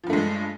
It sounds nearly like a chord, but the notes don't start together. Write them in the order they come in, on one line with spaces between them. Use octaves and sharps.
F3 G2 A3 G#3